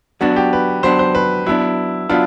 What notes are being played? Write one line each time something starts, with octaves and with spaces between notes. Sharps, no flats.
F#3 B3 D4 F#4
G4
B4
F#3 B3 D4 C5
C5
B4
F#3 B3 D4 E4
F#3 B3 D4 F4